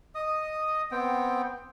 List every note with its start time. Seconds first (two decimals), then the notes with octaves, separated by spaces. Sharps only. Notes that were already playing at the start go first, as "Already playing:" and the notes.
0.15 D#5 D#6
0.91 B3 C4 G5